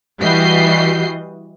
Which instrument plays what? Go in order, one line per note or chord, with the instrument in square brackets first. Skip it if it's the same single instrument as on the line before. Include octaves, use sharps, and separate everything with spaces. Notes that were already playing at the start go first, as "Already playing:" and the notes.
[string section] E3 G3 F#4 D#5 G6 C7